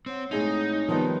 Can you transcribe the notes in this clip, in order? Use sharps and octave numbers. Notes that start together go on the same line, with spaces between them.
C4 C#5 F#5
A2 G#3 C4 D#4 G#4 C#5 F7
D#3 F3 G3 B3